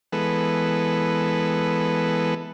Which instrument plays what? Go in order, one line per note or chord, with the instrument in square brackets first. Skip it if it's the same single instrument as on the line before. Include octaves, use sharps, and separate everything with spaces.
[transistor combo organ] E3 G#3 B3 A4 B4